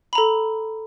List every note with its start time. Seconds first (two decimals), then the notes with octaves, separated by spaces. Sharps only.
0.13 B5
0.15 A#5
0.18 A4